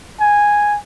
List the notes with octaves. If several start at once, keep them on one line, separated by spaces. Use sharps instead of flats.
G#5